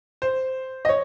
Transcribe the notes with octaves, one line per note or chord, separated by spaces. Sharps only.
C5
D#5
C#5